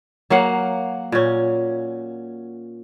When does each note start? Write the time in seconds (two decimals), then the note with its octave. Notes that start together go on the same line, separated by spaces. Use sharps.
0.30 F#3 A#3 F5 F#5
1.12 A#2 C#4